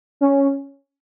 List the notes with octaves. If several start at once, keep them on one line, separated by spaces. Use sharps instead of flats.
C#4